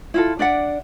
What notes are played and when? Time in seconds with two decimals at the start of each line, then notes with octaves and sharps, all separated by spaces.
0.14 E4 F4 A4
0.39 D4 D5 E5 F#5